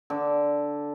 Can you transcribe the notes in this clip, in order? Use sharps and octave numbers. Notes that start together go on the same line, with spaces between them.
D3 D6